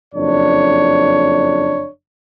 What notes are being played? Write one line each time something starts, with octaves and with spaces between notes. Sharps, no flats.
F#1 F2 D4 C#5